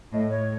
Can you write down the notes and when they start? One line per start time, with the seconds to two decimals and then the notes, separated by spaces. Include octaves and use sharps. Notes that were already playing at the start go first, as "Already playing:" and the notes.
0.13 A2 D#5
0.30 C#5